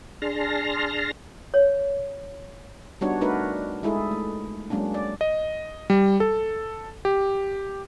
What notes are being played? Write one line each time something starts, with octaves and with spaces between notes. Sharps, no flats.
D4 G#4 A5 C6 F6 A#6
C#5
G3 B3 D4 D#4 F#4 C#5
A3 D4 D#4 F#4 A#4 B4
G#3 D#4 E4 G#4 A4
A3
F#3 G#3 A#3 C#4 D4
D5
D#5
G3
A4
G4